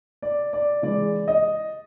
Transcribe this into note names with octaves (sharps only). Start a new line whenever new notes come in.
D5
D5
C#3 E3 G#3 D5
D#5